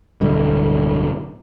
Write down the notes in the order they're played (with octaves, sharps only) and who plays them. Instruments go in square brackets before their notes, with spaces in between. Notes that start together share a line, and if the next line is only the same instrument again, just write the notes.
[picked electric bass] D1 B1 G2 D3